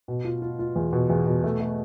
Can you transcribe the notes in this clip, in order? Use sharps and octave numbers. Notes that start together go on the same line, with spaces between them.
B2
F4
F4
F4
E2
B2
E2
B2
A3
A3